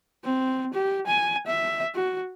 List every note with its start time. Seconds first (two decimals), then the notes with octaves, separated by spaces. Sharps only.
0.24 C4
0.74 G4
1.07 G#5
1.47 E5
1.95 F#4